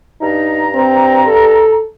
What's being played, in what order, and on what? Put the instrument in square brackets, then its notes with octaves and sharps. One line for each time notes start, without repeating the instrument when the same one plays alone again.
[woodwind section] G2 A#5 [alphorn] D#4
[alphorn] C4
A4